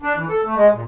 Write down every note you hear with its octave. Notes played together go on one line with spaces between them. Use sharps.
D4
E3
A4
A3
G#3
A#2